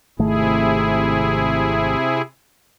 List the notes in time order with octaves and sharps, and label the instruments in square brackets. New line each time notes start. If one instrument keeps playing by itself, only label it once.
[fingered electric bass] G#1 D#3 A3 [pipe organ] C3 E4 G#4